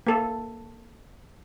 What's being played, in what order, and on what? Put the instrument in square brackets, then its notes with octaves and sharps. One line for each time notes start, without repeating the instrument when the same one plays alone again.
[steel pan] A#3 A4